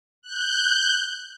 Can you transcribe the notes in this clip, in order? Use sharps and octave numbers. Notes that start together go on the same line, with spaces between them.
F#6 G6